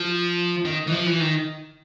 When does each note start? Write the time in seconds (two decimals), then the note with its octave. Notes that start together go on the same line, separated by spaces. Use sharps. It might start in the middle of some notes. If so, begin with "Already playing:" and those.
Already playing: F3
0.65 D#3
0.87 E3
0.92 F3
1.06 E3
1.20 D#3